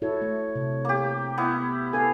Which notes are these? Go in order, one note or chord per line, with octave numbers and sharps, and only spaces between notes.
E4 F#4 A4 C#5
A3
C3
A#3 G4
B3 E4
A4 B4 F5 G#5